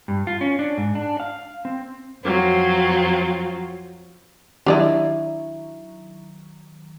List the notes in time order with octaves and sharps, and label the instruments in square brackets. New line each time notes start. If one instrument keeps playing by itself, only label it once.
[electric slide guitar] G2
F4
C#4
D4
G#2
D4
F5
C4
[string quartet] F2 F#3 C4 F4
[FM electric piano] D#3 F#3 [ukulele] D4 E4 [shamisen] G4 D5 D#5